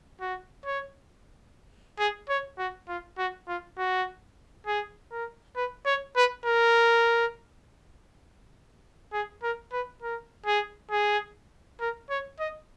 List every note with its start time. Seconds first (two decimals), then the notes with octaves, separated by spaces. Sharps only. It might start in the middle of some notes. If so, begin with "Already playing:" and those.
0.21 F#4
0.66 C#5
1.99 G#4
2.29 C#5
2.58 F#4
2.88 F4
3.18 F#4
3.48 F4
3.78 F#4
4.67 G#4
5.11 A#4
5.56 B4
5.86 C#5
6.16 B4
6.45 A#4
9.13 G#4
9.43 A#4
9.72 B4
10.02 A#4
10.46 G#4
10.91 G#4
11.81 A#4
12.10 C#5
12.39 D#5